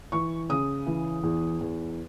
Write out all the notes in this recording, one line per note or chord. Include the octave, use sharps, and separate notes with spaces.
E3 C#6
C#3 D#6
E3
E2
E2